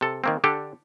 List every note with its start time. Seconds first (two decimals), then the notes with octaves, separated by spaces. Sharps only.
0.01 C3 A4
0.24 D#3 A#3 C4
0.44 D3 D4 G4 A4